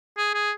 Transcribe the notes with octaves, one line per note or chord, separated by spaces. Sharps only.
G#4
G#4